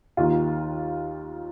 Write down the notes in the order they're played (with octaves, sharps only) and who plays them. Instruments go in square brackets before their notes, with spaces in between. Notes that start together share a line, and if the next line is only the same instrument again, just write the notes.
[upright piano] D#2 D#3 F4